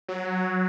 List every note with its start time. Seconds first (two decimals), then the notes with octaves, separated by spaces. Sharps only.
0.09 F#3